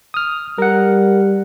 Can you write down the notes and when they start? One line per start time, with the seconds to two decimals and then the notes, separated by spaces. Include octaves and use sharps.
0.14 D#6 F6
0.58 G3 A#4 F#5